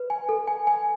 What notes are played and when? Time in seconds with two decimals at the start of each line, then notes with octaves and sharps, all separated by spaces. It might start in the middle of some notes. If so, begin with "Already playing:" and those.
Already playing: B4
0.10 G#5
0.29 A4
0.47 G#5
0.67 G#5